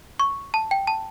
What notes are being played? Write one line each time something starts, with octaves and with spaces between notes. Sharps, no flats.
C#6
A5
G5
A5